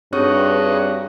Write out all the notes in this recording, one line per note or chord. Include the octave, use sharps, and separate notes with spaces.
G2 C4 D#4 F#4 G#4 B4 C#5 C#6